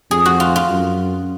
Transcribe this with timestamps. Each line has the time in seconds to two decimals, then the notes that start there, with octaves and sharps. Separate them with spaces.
0.11 F2 G#4
0.26 F#4
0.40 F4
0.56 F4
0.69 F#2